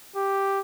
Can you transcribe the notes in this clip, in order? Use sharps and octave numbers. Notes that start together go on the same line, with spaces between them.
G4